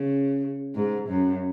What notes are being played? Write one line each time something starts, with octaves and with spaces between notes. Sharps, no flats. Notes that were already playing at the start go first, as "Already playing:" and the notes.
Already playing: C#3
G#2
F#2